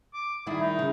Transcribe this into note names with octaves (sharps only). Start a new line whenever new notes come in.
D6
D#3 G3 E4 G#4
D#4
C#3